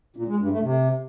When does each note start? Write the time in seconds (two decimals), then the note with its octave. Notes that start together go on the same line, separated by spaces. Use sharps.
0.16 A#2
0.28 G#3
0.39 G2
0.51 A3
0.63 C3